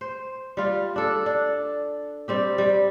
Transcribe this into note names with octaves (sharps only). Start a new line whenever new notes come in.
C5
G3 F4
D4 A4
D4
G3 C4 G4
G3